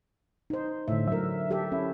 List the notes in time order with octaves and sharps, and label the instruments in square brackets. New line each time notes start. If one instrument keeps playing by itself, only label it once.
[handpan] D#4 C5
[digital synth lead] A2 [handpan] D3 E5
[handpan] F#3 A#4 [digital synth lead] E5
[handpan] G4 A4 E5
[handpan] C#4 [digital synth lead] E4